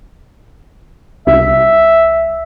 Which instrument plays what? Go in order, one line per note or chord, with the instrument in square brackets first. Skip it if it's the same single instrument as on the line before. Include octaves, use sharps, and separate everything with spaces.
[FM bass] C2 [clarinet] E5